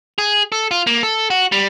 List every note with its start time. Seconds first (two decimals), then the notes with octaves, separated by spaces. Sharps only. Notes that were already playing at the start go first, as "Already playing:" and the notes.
0.18 G#4
0.52 A4
0.71 F4
0.87 A#3
1.03 A4
1.30 F#4
1.52 G3